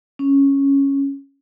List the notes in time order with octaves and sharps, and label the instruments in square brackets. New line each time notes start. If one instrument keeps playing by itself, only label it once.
[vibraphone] C#4